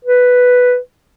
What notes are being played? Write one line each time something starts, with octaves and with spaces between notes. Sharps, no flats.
B4